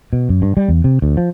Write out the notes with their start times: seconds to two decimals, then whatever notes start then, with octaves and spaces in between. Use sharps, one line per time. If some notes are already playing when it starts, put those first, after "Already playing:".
0.13 B2
0.29 F#2
0.42 G2
0.57 G3
0.68 E2
0.84 C3
1.02 D2
1.17 F3